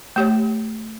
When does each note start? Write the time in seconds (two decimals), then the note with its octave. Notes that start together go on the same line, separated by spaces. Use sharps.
0.16 A3 G4 C#5